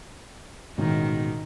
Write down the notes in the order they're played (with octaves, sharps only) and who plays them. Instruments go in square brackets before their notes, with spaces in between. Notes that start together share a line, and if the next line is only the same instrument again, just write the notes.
[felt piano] A1 G#2 B2 [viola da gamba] D#3